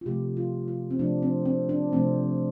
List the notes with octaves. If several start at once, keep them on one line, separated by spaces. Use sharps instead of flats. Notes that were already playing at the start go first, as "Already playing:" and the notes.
F4
C3 F3 A3 G4
F4
F4
C4
C3 F3 A3 D4
C4
C4
D4
C3 F3 A3 C4